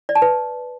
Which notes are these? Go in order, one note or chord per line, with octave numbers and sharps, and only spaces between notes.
D5
A5
B4